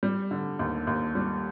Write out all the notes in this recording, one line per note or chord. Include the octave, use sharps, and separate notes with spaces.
G3
D3
D#2
D#2
G3